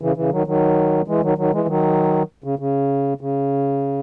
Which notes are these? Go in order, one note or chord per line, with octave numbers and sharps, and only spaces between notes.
C#3 E3
C#3 E3
D#3 F#3
D#3 F#3
E3 G#3
D#3 F#3
D#3 F#3
E3 G#3
D#3 F#3
C#3
C#3
C#3